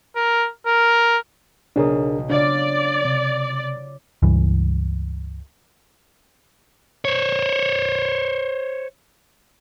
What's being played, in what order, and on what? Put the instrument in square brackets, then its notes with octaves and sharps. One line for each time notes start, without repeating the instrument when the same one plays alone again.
[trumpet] A#4
A#4
[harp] B1 C#3 D#6 [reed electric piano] D4 G#4 A#4
[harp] C#3 F4 [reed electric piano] D4 [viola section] D5
[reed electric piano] C3
[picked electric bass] C#2 G2 E3
[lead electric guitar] C5 C#5